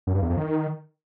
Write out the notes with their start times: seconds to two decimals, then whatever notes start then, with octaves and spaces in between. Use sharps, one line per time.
0.07 F#2
0.15 G2
0.22 E2
0.30 F2
0.37 D#3